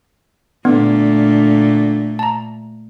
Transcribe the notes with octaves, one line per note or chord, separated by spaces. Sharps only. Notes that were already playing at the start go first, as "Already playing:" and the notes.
A#2 D3 A3 B3
A5 A#5